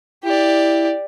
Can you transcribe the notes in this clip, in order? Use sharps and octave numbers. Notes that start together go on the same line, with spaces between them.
E4 G4 D5